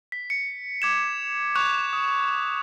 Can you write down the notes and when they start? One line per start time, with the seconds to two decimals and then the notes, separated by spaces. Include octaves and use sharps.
0.12 B6
0.30 C#7
0.82 D6 G#6 E7
1.55 C#6 F#6 G#6 F7
1.93 D#6